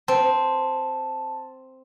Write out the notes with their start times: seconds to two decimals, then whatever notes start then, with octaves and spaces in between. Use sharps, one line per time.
0.08 C4 A5